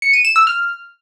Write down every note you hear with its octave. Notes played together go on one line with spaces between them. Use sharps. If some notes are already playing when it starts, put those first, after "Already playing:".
C#7
D#7
E7
E6
F6